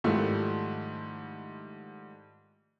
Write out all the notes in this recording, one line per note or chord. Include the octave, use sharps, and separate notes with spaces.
G#2 D#3 F3 G3 A3 E4